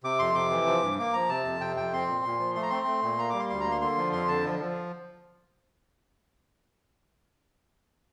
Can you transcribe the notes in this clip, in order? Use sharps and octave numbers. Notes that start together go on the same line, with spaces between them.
C3 D6
F2 C6
C3 D6
E3
F3
G2
A#3 D6
F3 A#5
C3 A5
F2
C3 G5
F2 G5
C4 C6
A#2
A#2
F3
A3 C6
A#5
C4 C6
A3
A#2
A#3 A#5
G3 D6
C6
D2 C6
A#3 A#5
C6
D3 C6
F3
F2 C6
D3 A5
F3
F3